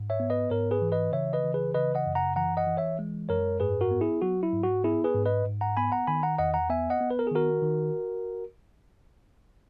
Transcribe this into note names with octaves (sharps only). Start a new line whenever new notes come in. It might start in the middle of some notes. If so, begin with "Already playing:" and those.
Already playing: G#2
C#5 E5
B3
B4 D#5
G#2 A#4 C#5
G#4 B4
E3
B4 D#5
C#3 C#5 E5
B4 D#5
E3
G#4 B4
C#3 B4 D#5
D#5 F#5
F#2
F#5 A#5
E3 F#5 A#5
D#5 F#5
E3
C#5 E5
G#3
F#2 A#4 C#5
G#2 G#4 B4
F#4 A#4
B3
E4 G#4
F#3 F#4
E4
G#2
F#4
B3 E4 G#4
G#4 B4
G#2
B4 D#5
G#2
F#5 A#5
B3 G#5 B5
F#5 A#5
D#3 G#5 B5
F#5 A#5
E2 D#5 F#5
F#5 A#5
B3 E5 G#5
D#5 F#5
B3
B4
A#4
G#4
D#3 F#4 A#4
D#3